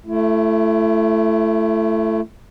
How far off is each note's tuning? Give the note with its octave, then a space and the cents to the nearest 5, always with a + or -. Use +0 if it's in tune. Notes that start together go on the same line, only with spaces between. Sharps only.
A3 +0 E4 +35